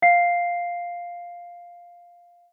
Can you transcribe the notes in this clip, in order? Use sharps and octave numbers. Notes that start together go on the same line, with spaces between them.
F5 C7